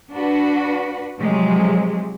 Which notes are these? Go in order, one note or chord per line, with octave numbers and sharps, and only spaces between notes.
D4 F#4 B4
C3 F3 F#3 G#3